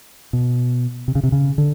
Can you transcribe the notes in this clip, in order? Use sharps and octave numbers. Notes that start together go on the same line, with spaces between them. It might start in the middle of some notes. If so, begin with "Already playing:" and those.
B2
C3
C#3
C3
C#3
D3